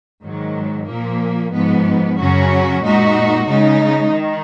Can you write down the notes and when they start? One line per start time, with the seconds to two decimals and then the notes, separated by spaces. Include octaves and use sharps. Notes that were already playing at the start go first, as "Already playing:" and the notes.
0.22 G#2 D#3 F#3
0.87 A#2 F3 A#3
1.52 G#2 F3 B3
2.18 F#2 C#3 F#3 C#4 F#4
2.83 A#2 G#3 D#4 F#4
3.47 C#3 G#3 D#4
4.12 D#3